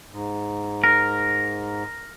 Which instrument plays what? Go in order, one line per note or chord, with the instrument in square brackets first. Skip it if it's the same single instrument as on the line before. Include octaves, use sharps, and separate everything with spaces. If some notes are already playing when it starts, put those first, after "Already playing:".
[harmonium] G#2
[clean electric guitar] A#4